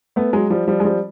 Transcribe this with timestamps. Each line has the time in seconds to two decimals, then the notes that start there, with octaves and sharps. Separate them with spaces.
0.16 A3 B3
0.33 F#3 G#3
0.50 F3 G3
0.68 F3 G3
0.80 G#3
0.85 F3 G3